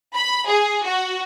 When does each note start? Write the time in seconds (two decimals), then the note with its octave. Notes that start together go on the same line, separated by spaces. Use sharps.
0.15 B5
0.47 G#4
0.85 F#4